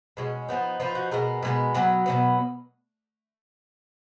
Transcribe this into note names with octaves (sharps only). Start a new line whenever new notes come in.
B2 G#3 C#4
F3 B3 D#4
F3 B3 D#4 F4
F#4
B2 G#3 B3 A#4
B2 G#3 B3
B2 F#3 B3
B2 F#3 B3